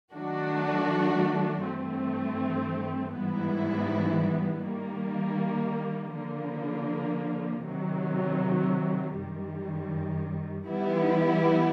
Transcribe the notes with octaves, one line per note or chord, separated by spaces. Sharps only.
D#3 F#3 A3 D4 F#4
G2 E3 A3 C4
G#2 E3 G3 B3 E4
D#3 G3 A#3
D3 F3 A#3
C3 D#3 F#3
F#2 D#3 G3
E3 G3 B3 E4